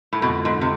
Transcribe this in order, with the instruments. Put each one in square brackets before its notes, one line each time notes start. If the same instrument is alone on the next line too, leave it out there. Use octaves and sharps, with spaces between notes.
[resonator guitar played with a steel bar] A2
[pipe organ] F2 D3 G#3 B3 F4 [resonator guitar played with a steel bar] B2
[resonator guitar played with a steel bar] G#2
C3